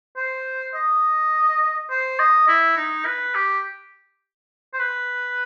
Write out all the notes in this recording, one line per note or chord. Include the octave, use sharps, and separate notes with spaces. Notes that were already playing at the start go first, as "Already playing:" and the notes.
C5
D#5
C5
D#5
E4
D#4
B4
G4
C5
B4